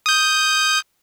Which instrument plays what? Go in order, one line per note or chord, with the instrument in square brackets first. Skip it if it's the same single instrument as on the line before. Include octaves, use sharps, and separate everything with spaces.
[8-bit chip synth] D#6 G6